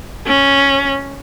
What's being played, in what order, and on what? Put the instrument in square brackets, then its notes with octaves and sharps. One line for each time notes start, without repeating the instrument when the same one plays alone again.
[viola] C#4